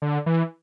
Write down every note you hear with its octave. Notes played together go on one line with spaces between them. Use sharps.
D3
E3